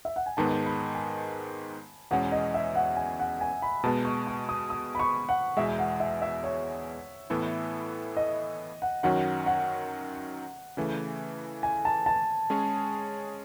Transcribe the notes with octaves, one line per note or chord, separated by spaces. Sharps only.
E5
F#5
G#5
G#2 D#3 G#3 B3 A5
B5
G#5
E2 B2 G#3 C#4 F#5
D#5
E5
F#5
G#5
F#5
G#5
B5
B2 G#3 B3 A5
C#6
C#6
D#6
D#6
B5
C#6
F#5
E2 B2 G#3 E5
F#5
E5
E5
C#5
A2 E3 B3 E4 A4
D#5
F#5
F#2 D#3 F#3 C#4 F#4 F#5
F#5
C#3 E3 A3
G#5
A5
A5
G#3 C#4 G#4 C#5